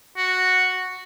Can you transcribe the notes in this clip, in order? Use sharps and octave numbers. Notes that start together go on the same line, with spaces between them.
F#4